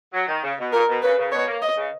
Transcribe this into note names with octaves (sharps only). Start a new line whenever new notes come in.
F#3
D#3
C#3
B2
A#2 A#4
B2
C#3 B4
C#3
B2 C#5
A#3
D#5
C#3